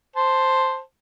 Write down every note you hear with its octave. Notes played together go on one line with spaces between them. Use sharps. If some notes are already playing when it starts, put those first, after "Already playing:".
C5 A5